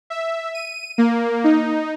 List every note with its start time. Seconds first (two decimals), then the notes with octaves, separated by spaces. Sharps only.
0.10 E5
0.54 D#7
0.98 A#3
1.44 D#4